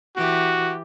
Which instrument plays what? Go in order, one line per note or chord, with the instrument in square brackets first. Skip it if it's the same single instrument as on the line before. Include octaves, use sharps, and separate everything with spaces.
[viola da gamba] E3 G4 [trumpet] F#4